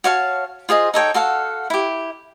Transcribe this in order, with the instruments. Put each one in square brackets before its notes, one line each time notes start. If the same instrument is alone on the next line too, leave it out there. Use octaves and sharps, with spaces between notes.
[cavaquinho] F#4 C#5 F5 A5
F4 G#4 C5 D#5
D#4 A4 C#5 G5
F#4 A4 F5 F#5
E4 G4